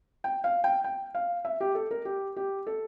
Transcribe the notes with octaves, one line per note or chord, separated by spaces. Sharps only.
G5
F5
G5
G5
F5
E5
G4
A4
A#4
G4
G4
A4